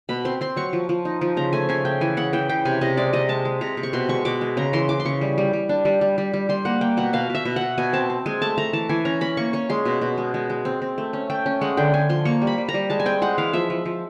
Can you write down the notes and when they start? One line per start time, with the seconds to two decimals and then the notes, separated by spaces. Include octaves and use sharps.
0.09 B2 B5
0.25 C4 C6
0.41 C4 C6
0.56 F#3 C#6
0.73 F3
0.89 F3
1.05 D#4
1.21 F3
1.37 C#3 A#5
1.53 A3 G#5
1.69 C#3 G#5
1.85 C#3 G5
2.01 E3 G#5
2.17 C#3 F#5
2.33 E3 G5
2.49 C#3 G5
2.65 C3 G#5
2.81 C3 D#5
2.97 G#3 D5
3.13 C3 D#5
3.29 G#3 A5
3.45 G#3
3.61 C3 A#5
3.77 C3
3.83 C#6
3.93 B2 C6
4.09 G#3 C#6
4.25 B2 D6
4.41 G#3
4.57 C#3 A#5
4.73 E3 C6
4.89 E3 D6
5.00 C6
5.05 C#3 C#6
5.21 G3
5.38 G3
5.53 G3
5.69 D4
5.85 G3
6.01 G3
6.18 G3
6.34 G3
6.49 G3 C6
6.65 A#3 F#5
6.81 A#3 G5
6.97 B2 F#5
7.13 B2 F5
7.30 B2 E5
7.45 B2
7.56 B2 F#5
7.78 B2 G#5
7.93 C4 A5
8.10 C4
8.26 G#3 G#5
8.42 A3 A5
8.58 A3 A#5
8.73 E3 A5
8.89 E3 G#5
9.05 C#4 A#5
9.21 C#4 B5
9.37 A#3 C#6
9.53 C#4 C#6
9.70 G#3 C6
9.85 B2
10.01 B2
10.18 G#3
10.34 G#3
10.50 G#3
10.65 C4
10.82 C4
10.98 A3
11.13 C#4
11.30 A3 G5
11.46 C#4
11.61 G#3 F#5
11.77 D3 G5
11.94 D3 G#5
12.09 F3 C6
12.25 A#3 C#6
12.42 G3
12.47 B5
12.58 G3
12.69 A#5
12.74 G3
12.90 G#3 A5
13.00 G#5
13.06 C4 G5
13.22 G#3 F#5
13.38 E3 F5
13.53 F3 E5
13.70 F3
13.85 F3